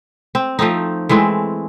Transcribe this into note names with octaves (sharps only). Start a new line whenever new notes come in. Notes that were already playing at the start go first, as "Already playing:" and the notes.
C4
F3 A3 C4 D#4
E3 G#3 A3 C4